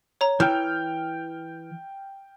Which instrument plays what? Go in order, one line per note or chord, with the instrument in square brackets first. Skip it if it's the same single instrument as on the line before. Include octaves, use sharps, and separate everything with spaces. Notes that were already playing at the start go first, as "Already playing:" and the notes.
[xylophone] C#5 A#5
[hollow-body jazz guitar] E3 [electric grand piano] G5 F6 G6